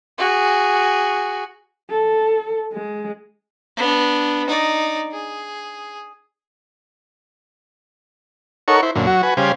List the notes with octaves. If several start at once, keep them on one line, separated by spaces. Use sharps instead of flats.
F#4 G#4
A4
G#3
B3 D4
D#4 D5
G#4
D#4 A4 A#4 C#5 F#5 C#6
E4 C5
F#2 A#2 D3
F#3 F#4
F#4 B4 G#5
C#3 G3 C5 F5 G#5